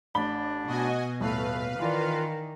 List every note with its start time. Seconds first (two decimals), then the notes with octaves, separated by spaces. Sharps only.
0.15 A1 D4 B5 G7
0.67 B2 F#4 D#5 G#5
1.20 D#1 A2 A3 B4 F5
1.79 D#3 E3 F4 D5